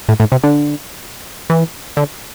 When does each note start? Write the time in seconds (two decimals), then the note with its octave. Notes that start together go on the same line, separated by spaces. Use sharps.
0.09 A2
0.20 A2
0.32 C3
0.44 D3
1.50 E3
1.97 D3